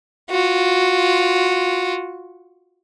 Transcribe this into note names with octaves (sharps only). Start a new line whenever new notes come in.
F4 F#4